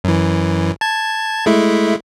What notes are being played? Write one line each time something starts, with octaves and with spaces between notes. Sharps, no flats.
F#2 E3
A5 G#6
G#3 A3 E4